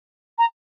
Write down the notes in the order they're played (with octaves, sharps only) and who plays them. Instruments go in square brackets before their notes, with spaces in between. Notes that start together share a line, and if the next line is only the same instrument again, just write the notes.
[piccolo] A#5